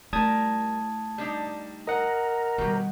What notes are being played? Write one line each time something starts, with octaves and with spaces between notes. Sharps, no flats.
G3 A3 E4 A#4 A5 D#6 G#6
G3 D4 D#4
A#4 D#5 F#5
B2 D#3 G3 G4